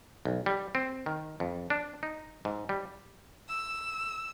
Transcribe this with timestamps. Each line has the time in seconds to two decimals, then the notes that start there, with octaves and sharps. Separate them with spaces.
0.25 B1
0.46 G3
0.75 C4
1.06 D#3
1.40 F2
1.70 D4
2.03 D#4
2.45 G#2
2.69 G3
3.49 E6